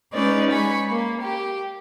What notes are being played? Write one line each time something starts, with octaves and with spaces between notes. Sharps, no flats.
G#3 C#4 D#4 B4 D5
G#3 G#5 B5 C#6
A#3
G4